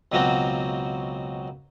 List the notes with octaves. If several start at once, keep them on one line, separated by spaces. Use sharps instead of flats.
C#2 B2 F#3 A#3 C4 F#4